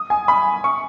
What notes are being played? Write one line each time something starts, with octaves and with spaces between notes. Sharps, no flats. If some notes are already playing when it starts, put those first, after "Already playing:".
Already playing: D#6
G#5
B5
C#6